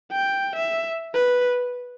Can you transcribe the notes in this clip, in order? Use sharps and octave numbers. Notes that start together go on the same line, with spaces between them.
G5
E5
B4